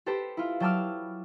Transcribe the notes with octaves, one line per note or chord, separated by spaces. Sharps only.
G4 A4 B4 C5
E4 F4
F#3 G5 A5 D6 E6 F6